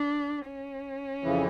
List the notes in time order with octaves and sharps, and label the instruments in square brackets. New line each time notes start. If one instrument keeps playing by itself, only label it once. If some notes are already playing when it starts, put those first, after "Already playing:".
Already playing: [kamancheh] D4
C#4
[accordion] F2 C#3 E3